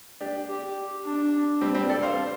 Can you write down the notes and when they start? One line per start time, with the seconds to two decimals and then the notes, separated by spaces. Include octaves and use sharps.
0.21 D4 G4
0.49 G4
1.05 D4
1.61 G3 C4
1.75 G3 C4
1.89 A4 D5
2.03 C5 F5